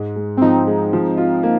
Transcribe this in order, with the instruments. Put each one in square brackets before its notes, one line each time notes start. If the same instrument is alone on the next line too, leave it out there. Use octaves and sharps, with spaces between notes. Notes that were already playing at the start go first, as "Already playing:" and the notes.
Already playing: [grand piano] G#2 G#3
G#3
[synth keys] C4
[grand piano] F3 [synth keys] D#4
[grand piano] G#3
F3
F4
A#3